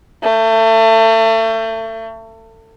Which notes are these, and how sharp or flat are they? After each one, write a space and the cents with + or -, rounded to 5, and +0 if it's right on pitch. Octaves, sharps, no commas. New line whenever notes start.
A3 +30